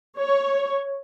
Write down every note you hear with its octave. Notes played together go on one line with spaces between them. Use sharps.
C#5